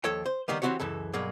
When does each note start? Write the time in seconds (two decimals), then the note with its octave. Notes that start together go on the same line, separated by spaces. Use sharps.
0.04 D#2 F3 A4 C#5 G5
0.26 C5
0.48 D#3 G3 A#3 B3
0.62 E3 C4 D#4 F#4 G4 C#5
0.80 C#2 F#2 E3 A4
1.13 B1 G2 F#3 A#3 G#4